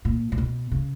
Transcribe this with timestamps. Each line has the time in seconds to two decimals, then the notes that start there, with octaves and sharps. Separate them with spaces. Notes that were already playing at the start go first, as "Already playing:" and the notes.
0.05 A#2
0.32 A#2
0.38 B2
0.72 C#3